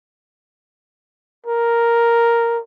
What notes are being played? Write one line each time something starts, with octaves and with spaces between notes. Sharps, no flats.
A#4